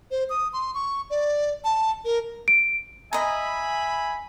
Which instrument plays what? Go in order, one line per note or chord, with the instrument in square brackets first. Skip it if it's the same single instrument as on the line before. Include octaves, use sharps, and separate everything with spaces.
[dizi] C5
D#6
C6
C#6
D5
A5
A#4
[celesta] D7
[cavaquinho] D#5 A#5 [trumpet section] E5 B5 [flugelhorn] G#5